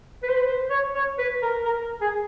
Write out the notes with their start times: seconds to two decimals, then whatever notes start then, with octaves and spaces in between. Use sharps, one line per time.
0.23 B4
0.29 C5
0.36 B4
0.47 C5
0.70 C#5
0.95 C#5
1.18 B4
1.42 A#4
1.65 A#4
2.01 G#4